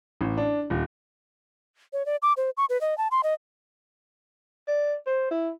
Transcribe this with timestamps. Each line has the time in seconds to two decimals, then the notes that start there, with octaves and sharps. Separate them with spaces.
0.21 A1
0.37 D4
0.70 D#1
1.93 C#5
2.06 D5
2.22 D6
2.37 C5
2.57 C#6
2.69 B4
2.81 D#5
2.98 A5
3.11 C6
3.23 D#5
4.68 D5
5.06 C5
5.31 E4